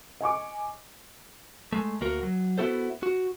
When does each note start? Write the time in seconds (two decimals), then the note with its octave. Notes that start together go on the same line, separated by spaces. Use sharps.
0.21 D#5 G#5 C#6 D6
1.73 G#3 A3
2.01 D2 A#3 F#4 A#4
2.23 F#3
2.58 B3 E4 F#4 A4 C5
3.03 F#4